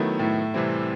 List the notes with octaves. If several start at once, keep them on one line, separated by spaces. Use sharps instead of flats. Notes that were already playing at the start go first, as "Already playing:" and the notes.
Already playing: D#3 F#3 A3 B3 E4
A2 A3
C3 E3 G3 C4 E4